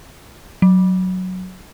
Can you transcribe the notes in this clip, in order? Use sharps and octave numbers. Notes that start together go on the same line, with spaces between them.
F#3